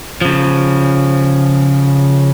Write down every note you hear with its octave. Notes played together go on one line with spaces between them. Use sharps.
C#3 F3